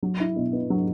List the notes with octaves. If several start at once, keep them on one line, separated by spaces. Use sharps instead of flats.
F#3
E4
B2
B3
F#3